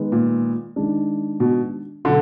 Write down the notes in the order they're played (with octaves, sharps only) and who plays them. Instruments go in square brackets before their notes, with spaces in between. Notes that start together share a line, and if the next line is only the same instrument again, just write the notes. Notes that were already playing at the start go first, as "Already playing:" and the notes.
Already playing: [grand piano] D#3 G#3 B3
[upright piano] A#2
[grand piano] D#3 G#3 D4
[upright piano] B2
[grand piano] B2 F#3 [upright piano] D3